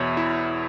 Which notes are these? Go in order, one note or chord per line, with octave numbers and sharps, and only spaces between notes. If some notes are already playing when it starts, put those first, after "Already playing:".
Already playing: E2 B2 C#5 E5
E4